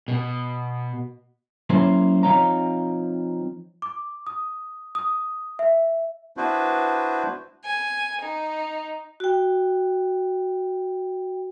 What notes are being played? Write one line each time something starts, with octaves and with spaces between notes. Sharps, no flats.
B2
F#3 A#3 C#4 E4 C5
F3 C4 D#4 C#5 F5 A#5
D6
D#6
D#6
E5
B3 D4 E4 F#4 B4 C5
G#5
D#4
F#4 G5